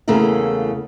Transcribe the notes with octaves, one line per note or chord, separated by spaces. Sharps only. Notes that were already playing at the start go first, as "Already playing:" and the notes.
E2 C#3 A3 A#3 E4